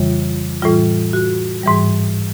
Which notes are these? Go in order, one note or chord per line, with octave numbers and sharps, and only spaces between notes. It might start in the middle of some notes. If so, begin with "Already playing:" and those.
Already playing: F2 C#3 E3 G3 F4
A2 E3 G3 F4
F#4
G#2 E3 G3